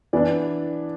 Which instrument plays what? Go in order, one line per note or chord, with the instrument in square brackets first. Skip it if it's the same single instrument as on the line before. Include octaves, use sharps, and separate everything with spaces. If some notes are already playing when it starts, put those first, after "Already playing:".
[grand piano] E3 B3 D4 D5